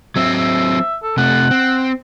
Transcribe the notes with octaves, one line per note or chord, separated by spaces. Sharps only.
F#3 C4 E5
E5
A4
C3 A3 F#5
C4